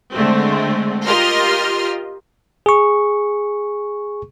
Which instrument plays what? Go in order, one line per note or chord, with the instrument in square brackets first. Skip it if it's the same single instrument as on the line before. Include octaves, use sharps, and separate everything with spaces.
[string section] D3 G#3 A3 C4
F4 G4 A#4 D#5 C6 F6
[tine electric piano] G#4 C#6